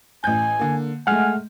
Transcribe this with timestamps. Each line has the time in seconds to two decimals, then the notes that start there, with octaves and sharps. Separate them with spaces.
0.24 A1 G#5 G6
0.59 D3 A#3
1.07 G#3 A3 F#5 G#5 F6